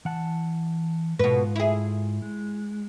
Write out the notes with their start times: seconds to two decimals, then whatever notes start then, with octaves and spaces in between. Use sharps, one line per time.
0.05 E3 F#5 A5
1.19 G#2 B2 F4 B4
1.56 E4 G#4
2.22 G#3